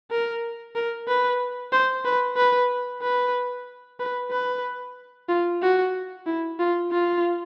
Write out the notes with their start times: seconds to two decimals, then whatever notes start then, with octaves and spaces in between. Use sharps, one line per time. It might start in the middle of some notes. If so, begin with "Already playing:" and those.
0.11 A#4
0.75 A#4
1.08 B4
1.72 C5
2.05 B4
2.37 B4
3.02 B4
4.00 B4
4.31 B4
5.29 F4
5.62 F#4
6.26 E4
6.59 F4
6.92 F4